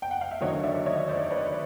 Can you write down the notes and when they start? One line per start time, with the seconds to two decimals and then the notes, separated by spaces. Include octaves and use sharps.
0.02 G5
0.11 F#5
0.21 F5
0.31 E5
0.41 D#2 D3 F#3 C#5 D#5
0.64 D5 E5
0.86 C#5 D#5
1.08 C5 D5
1.31 B4 C#5